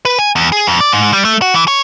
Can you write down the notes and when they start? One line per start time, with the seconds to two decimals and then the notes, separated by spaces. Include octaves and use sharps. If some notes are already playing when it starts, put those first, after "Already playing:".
0.05 B4
0.19 G#5
0.36 E2
0.52 G#4
0.67 F2
0.80 D5
0.92 G#2
1.13 G3
1.25 A3
1.42 F#4
1.54 E3
1.68 C#5